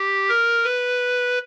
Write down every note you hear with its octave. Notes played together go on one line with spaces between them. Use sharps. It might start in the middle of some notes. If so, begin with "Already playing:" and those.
Already playing: G4
A#4
B4